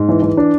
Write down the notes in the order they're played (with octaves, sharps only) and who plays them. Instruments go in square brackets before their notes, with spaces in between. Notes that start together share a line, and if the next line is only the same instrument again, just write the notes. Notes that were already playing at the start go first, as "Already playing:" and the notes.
Already playing: [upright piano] G#2
E3
E3
D4